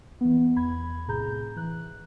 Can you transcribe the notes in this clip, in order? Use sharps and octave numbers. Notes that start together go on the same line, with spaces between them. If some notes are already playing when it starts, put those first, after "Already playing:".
E3 B3
E2 B5 G#6
B1 A2 C3 G#4 A#5 G6
E3 F#6